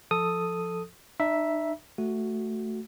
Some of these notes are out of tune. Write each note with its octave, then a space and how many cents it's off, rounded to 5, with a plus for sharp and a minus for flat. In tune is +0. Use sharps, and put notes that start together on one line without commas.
F3 +0 A4 +0 D#6 +0
D#4 -45 E5 +0 A#5 +45
A3 +0 F#4 +0